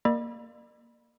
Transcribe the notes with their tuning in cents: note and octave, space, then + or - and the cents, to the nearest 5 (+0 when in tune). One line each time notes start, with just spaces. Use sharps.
A#3 +0 D5 +45 B5 -25